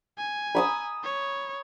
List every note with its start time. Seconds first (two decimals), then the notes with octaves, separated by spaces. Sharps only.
0.18 G#5
0.55 B5 D#6 E6
1.04 C#5